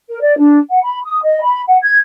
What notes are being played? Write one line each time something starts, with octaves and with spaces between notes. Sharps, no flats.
A#4
D5
D4
F#5
B5
D#6
D#5
B5
F#5
G#6